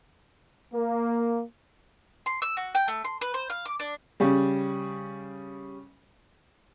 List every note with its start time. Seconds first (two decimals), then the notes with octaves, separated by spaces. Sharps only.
0.73 A#3
2.26 C6
2.42 E6
2.57 F#4
2.75 G5
2.88 A3
3.04 C6
3.21 B4
3.34 C5
3.50 F5
3.65 D6
3.80 D4
4.20 C#3 G3